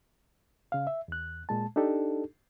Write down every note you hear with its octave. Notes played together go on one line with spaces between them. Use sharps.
C#3 F5
E5
E2 F#6
A#2 G#3 A5
D4 D#4 G4 A4